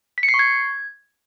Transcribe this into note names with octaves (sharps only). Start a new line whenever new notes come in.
B6
C#7
C7
C#6
G#6